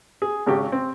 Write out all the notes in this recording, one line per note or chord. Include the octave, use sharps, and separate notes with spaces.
G#4
G#1 C#3 G4
C4